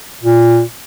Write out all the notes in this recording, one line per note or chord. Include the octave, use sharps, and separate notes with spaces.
A#2